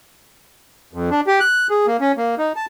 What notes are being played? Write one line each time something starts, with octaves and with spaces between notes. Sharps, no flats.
F2
D4
G4
F#6
G#4
A#3
C#4
A#3
D#4
A5